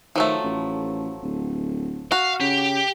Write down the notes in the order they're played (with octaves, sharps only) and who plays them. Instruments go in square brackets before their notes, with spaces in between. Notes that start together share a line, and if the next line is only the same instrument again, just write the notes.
[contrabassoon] D#3 [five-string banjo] F3 F#3 A3
[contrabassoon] A1
D1
[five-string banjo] F#4 [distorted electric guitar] F5
[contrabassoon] C#3 [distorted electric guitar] G4